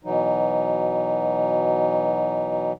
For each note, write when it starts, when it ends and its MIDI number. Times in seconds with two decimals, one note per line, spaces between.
0.04 2.73 47
0.04 2.73 52
0.04 2.73 54
0.04 2.73 63